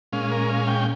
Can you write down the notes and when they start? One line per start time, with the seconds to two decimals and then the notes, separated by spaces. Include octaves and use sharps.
0.12 A#2 G#3 C#4 F5
0.31 A#4
0.50 F5
0.68 G5